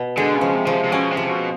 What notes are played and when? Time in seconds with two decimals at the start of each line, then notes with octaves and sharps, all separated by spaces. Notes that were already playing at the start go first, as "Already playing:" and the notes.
Already playing: B2
0.17 D3 G#3
0.36 C#3
0.41 F3
0.54 C3
0.65 C#3 F3
0.73 C3
0.84 C3
0.92 B2 C#4
1.11 C3
1.17 F3
1.29 B2